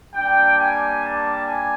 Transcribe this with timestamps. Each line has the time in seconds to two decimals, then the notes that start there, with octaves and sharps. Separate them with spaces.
0.15 G3 A#3 D4 G5
0.59 G#5
1.03 A5
1.46 G#5